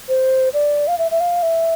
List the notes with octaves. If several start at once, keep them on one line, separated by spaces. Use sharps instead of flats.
C5
D5
F5
E5
E5
F5
E5